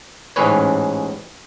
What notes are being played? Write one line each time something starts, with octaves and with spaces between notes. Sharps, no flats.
A1 G#2 C#4 B4 C#5